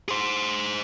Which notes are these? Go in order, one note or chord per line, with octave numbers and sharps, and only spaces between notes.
G#4 C5